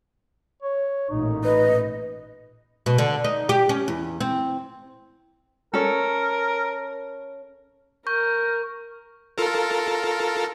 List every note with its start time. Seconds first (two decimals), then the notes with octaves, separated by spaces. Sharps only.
0.63 C#5
1.10 A1 A#2 D#4
1.44 B4 D#5
2.86 B2
2.98 D3
3.24 D#4
3.49 G4
3.69 C#4
3.88 E2
4.21 C4
5.74 C#4 A4 A#4
8.07 A#4 C#6 G6
9.38 F4 A4 A#4